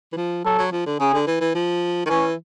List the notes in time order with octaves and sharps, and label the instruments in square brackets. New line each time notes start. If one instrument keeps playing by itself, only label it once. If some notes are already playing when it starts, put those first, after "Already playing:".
[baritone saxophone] E3
F3
[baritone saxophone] F#3 [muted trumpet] A4
[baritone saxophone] F#3
F3
D3
[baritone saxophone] C#3 [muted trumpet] G#4
[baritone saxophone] D3
E3
E3
F3
D#3
[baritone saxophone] E3 [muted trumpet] C#4